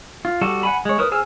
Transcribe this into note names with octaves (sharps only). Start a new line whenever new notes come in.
F4
G3 F#4 A4
F#5 G#5 B5
G#3 C#5
E4 A#4 B4 D#6
G#4 C5 G#5 E6 F6